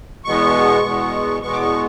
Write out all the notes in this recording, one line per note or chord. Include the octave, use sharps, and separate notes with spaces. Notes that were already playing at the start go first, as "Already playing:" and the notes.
E2 B2 G#3 B3 C#6
E2 B2 G#3 B3
E2 B2 G#3 B3 C#6
D6
C#6